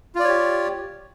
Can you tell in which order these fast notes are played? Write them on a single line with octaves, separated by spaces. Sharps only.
F4 D5 C#5 G4